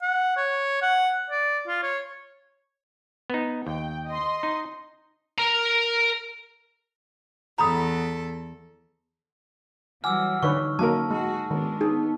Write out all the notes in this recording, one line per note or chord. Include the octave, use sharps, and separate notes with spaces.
F#5
C#5
F#5
D5
F4
C#5
B3 D#4
D#2 G5
D#5 C6
D#4
A#4 A#5
E2 A4 A#5 B5 D#6
E3 F#3 G3 F#5 G#5 D6 E6 F6
D3 D#4 B4 C#5 C#6
F#3 A#3 C#4 A#4 A5
G#3 F#4 G#4
D#3 G#3 B3 D4
B3 D#4 G#4